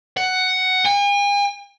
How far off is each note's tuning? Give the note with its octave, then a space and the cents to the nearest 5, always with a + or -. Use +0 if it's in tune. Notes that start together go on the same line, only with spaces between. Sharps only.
F#5 +10
G#5 -45